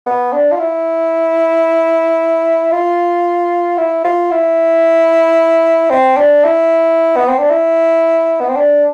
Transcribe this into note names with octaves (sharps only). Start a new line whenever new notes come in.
B3
D4
F4
E4
F4
E4
F4
E4
C4
D4
E4
B3
C4
D4
E4
B3
C4
D4